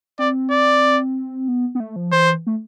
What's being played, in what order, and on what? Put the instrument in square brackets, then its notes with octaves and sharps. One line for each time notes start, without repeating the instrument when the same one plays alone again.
[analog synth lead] C4 [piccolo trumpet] D5
[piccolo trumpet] D5
[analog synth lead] B3
B3
A3
F3
[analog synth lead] E3 [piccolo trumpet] C5
[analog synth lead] A3